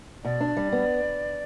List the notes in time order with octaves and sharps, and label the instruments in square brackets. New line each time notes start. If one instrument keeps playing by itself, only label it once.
[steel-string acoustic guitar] B2 [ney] D5
[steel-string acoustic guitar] D4
G3
B3